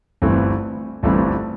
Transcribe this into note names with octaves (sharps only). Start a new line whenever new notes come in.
G1 G2 E3 A3 C4
G1 G2 E3 A3 C4